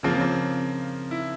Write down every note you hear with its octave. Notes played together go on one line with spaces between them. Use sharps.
C#3 F3 A#3 C4
C4
E4